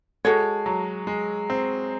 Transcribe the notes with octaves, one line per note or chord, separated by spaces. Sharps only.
G#3 F#4 A4 C#5
F#3
G#3
C4